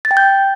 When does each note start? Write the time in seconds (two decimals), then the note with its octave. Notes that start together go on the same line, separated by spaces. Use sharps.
0.05 A6
0.11 G5
0.17 G6